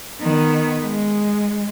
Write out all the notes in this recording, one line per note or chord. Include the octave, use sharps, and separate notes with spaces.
D#3 B3
G#3